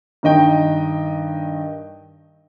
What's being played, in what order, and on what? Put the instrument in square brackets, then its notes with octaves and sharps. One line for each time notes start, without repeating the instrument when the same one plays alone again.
[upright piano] G2 D#3 D#5 G5